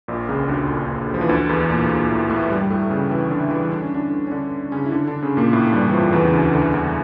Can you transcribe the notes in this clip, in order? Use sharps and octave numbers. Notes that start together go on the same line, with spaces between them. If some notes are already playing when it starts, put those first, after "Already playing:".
A#1 A#2
C#2 C#3
D2 D3
F3
E3
D2 D3
E2 E3
A#2 A#3
A#2 A#3
A2 A3
A2 A3
G2 G3
G3
A2 A3
C#3 C#4
E3 E4
D3 D4
E3 E4
D4
C#4
D3 D4
C#4
D3 D4
C#3 C#4
E4
D3 D4
D3 D4
C#3 C#4
A#2 A#3
A2 A3
A3
G2 G3
E3
F2 F3
E2 E3
C#3
D2 D3
D2 D3
E2 E3